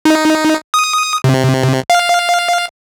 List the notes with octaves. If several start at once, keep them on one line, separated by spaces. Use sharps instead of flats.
D#4
D#6
C3
F5